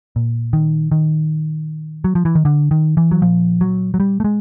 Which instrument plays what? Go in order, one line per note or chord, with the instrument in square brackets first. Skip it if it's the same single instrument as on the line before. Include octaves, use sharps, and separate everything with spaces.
[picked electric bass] A#2
D#3
D#3
F#3
F3
E3
D#3
D3
D#3
E3
F#3
A#2 F3
F#3
F#3
G3
A3
G#3